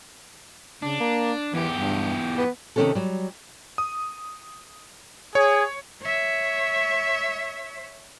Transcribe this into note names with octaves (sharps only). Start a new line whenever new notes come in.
C#3 D4
A#3
E2 E3 G4
G2
B3
C3 D#3 C4 C#4 G4 A4
F#3 G3
D#6
G#4 C#5
C#5 E5